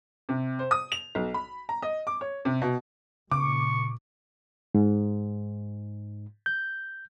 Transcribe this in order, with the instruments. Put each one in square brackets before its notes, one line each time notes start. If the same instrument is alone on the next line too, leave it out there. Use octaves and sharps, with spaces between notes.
[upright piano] C3
C5
D#6
F7
B1
B5
A#5
D#5
D6
C#5
C3
B2
[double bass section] A#2 [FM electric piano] C#3 [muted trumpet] C#6 [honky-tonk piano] D6
[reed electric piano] G#2
G6